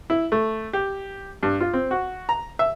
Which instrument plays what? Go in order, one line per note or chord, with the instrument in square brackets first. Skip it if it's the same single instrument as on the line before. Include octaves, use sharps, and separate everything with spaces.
[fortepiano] E4
A3
G4
G2
F4
C4
F#4
A#5
E5